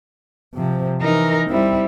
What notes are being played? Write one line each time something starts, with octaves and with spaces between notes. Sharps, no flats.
C3 F3
E3 D#4 A#4
G3 C4 E4